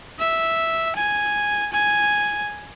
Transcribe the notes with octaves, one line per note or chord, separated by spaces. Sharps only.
E5
G#5
G#5